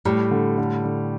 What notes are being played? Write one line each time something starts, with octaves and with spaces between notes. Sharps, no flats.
A2 G3
D3
D3
D3